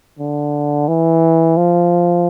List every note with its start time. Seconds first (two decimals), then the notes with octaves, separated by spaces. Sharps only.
0.19 D3
0.88 E3
1.57 F3